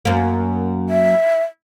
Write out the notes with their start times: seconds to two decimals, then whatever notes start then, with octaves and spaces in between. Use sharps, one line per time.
0.05 F#2 A#3
0.89 E5